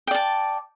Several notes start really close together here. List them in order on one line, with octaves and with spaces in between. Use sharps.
G5 D5 A5